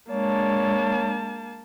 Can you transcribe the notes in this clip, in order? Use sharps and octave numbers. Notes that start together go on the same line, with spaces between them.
G#3 A#3 D4 C#5 A5